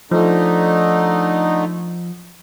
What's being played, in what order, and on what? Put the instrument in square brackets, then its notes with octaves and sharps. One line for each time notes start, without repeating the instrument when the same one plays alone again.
[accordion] D3 A3 D#4 [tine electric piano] F3